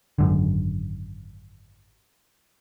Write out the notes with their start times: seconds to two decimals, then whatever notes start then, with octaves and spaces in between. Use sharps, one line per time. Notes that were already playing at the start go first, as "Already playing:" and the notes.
0.18 G#1 F#2 D3